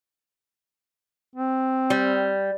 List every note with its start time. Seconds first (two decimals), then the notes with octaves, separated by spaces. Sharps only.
1.35 C4
1.90 G3